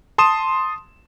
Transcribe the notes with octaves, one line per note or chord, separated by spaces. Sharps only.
A5 C6 D#6 E7